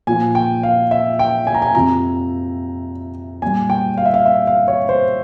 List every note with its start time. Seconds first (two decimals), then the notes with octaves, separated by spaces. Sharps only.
0.07 A#2 F3 G#5
0.35 G5
0.63 F5
0.91 E5
1.19 G5
1.47 G#5
1.54 A#5
1.62 G#5
1.75 F2 C3 F3 A#5
3.42 A#2 G3 G#5
3.70 G5
3.98 F5
4.06 E5
4.14 F5
4.26 E5
4.47 F5
4.68 C#5
4.89 C5